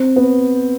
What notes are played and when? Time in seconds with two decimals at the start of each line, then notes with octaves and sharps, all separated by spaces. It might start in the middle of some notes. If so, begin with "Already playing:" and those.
Already playing: C4
0.16 B3